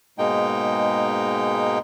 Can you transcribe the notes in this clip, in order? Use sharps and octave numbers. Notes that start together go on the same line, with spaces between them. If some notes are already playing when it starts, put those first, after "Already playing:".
G#2 B2 G#3 A#3 D#4 G5